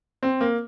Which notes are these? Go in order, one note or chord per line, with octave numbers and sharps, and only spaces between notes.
C4
A#3